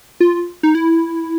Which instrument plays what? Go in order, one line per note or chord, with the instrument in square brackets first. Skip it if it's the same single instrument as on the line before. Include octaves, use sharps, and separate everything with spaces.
[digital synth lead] F4
D#4
E4